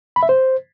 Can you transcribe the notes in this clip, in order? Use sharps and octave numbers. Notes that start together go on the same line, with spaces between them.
B5
E5
C5